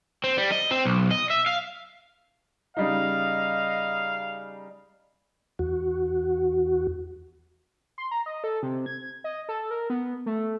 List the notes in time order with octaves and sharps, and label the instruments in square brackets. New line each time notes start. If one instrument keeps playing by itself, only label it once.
[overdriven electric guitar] C4
G3
D#5
C4
B1
D#5
E5
F5
[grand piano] C#3 G3 D#4 [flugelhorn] D#5 [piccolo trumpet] F5
[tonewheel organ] E2 F#4
[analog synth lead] C6
A#5
D#5
A4
C3
G#6
D#5
A4
A#4
B3
A3